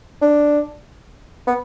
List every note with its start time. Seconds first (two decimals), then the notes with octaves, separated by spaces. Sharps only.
0.22 D4
1.47 B3